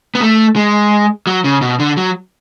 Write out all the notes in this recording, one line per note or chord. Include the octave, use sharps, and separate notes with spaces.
B3
A3
G#3
F#3
C#3
B2
D3
F#3